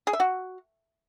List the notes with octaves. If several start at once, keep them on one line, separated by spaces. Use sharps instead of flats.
G#4
E5
F#4